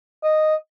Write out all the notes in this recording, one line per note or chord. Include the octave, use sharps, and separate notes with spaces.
D#5